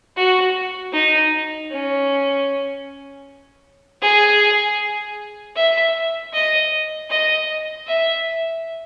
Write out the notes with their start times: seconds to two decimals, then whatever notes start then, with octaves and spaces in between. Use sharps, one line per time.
0.16 F#4
0.93 D#4
1.71 C#4
4.01 G#4
5.55 E5
6.33 D#5
7.10 D#5
7.86 E5